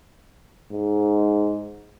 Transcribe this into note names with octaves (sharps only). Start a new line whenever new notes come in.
G#2